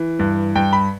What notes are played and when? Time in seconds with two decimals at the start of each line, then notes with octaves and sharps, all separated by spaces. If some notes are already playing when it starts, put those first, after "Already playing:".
Already playing: E3
0.19 G2
0.55 G2 G5
0.73 B5